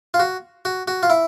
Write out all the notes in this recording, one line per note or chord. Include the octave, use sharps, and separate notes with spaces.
F4
F#4
F#4
F#4
F4
E4